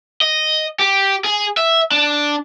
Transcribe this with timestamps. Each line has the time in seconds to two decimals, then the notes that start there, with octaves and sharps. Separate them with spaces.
0.21 D#5
0.79 G4
1.24 G#4
1.57 E5
1.91 D4